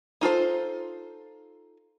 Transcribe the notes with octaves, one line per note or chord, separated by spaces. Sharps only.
D#4 F4 A4 C5